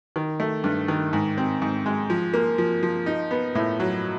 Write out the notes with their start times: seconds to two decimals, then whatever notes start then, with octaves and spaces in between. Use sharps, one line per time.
0.16 D#3
0.40 A3
0.64 G2
0.88 D#3
1.13 G#2
1.37 C4
1.62 G#2
1.86 G#3
2.10 F3
2.34 A#3
2.58 F3
2.83 F3
3.06 D#4
3.31 B3
3.55 A2
3.80 F#3